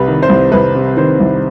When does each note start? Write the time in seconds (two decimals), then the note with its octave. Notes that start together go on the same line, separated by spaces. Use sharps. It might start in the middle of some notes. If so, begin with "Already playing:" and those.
Already playing: C2 C3 B4
0.08 D#3
0.23 C5
0.29 C2
0.52 C2 B4
0.75 C3
0.97 D#3 C5
1.20 C2